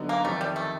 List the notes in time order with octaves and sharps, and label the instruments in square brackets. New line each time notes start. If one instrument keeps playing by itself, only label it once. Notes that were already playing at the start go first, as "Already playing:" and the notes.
Already playing: [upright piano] D3 F#3 B3 D#4
[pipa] A#3
[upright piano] F2 C3 D#3 [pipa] A3
[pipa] G3
A3